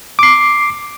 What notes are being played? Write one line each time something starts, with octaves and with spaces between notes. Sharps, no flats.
D6 C7